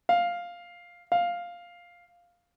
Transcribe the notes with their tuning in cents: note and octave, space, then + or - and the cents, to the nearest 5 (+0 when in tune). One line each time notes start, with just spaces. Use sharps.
F5 +0
F5 +0